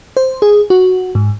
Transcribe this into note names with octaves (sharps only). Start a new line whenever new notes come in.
C5
G#4
F#4
G#2